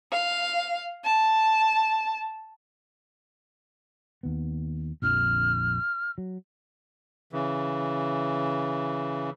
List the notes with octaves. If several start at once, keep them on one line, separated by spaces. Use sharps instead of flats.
F5
A5
D#2 B3
A#1 F2 D3 F6
F#3
C#3 E3